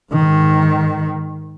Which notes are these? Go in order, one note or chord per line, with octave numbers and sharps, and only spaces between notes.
G#2 D#3